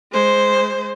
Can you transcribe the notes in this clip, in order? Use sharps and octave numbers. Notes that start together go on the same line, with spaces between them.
G#3 C5